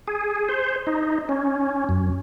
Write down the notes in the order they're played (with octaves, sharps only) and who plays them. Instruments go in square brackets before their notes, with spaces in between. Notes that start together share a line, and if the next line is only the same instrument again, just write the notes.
[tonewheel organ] G#4
C5
D#4
C#4
F#2